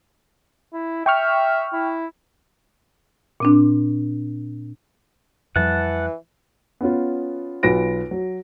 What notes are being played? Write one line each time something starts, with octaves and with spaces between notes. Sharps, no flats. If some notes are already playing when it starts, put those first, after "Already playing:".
E4
E5 G5 C#6 F6
E4
A#2 C4 D4
F2 E3 F3 G3 F#5 A5
B3 C#4 F4
B1 F4 B4 A#6 D7
F#3